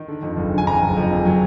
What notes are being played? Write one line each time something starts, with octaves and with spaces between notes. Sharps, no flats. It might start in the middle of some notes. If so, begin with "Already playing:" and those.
Already playing: D#3
D3
F2
F#1
D3
G#5
F#1 A#5
F#1
F2
F#1
F#3